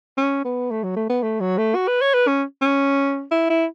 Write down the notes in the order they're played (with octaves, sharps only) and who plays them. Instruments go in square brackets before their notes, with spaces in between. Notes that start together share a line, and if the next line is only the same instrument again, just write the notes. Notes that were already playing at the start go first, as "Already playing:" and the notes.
[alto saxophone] C#4
B3
A3
F#3
A3
B3
A3
F#3
A3
F#4
B4
C#5
B4
C#4
C#4
E4
E4